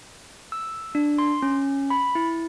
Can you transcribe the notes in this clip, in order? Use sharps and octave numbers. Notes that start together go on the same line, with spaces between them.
E6
D4
C6
C#4
B5
E4